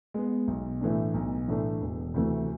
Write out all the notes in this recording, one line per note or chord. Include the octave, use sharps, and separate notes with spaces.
G#3 B3
B1
A2 E3 A3 D4
B1
A2 E3 A3 D4
E1
D2 C3 E3 A3